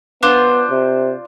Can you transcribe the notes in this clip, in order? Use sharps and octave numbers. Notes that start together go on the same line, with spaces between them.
B3 D4 F4 C5
C3